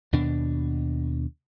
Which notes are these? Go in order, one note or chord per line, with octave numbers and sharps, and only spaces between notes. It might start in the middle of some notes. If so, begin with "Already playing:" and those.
D#2 B2 D4